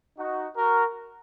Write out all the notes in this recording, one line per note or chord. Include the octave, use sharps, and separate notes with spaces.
D#4 F#4
F#4 A#4